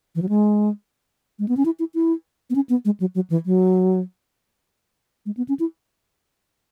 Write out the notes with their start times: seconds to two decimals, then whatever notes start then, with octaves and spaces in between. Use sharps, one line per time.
0.15 E3
0.22 F#3
0.29 G#3
1.39 G#3
1.48 B3
1.57 C#4
1.65 E4
1.79 E4
1.94 E4
2.50 B3
2.55 C#4
2.69 B3
2.85 G#3
3.00 F#3
3.15 F#3
3.30 E3
3.46 F#3
5.26 G#3
5.37 B3
5.49 C#4
5.59 E4